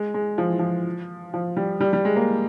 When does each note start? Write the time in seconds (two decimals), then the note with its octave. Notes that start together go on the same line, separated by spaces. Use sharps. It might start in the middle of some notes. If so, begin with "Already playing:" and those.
Already playing: G#3
0.14 G#3
0.38 F3
0.49 E3
0.59 F3
1.34 F3
1.57 G3
1.81 G3
1.93 G3
2.05 G#3
2.16 A#3